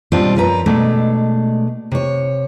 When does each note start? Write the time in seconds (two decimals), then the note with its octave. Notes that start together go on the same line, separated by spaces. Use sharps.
0.12 G#2 B2 G3 C4 D4 F4
0.36 F#2 F3 A#4 B4 A#5
0.66 B2 G#3 A3 D4
1.92 C3 C#5